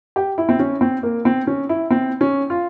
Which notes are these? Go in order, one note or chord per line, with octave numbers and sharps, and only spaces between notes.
G4
E4
C4
C#4
C4
A#3
C4
C#4
E4
C4
C#4
F4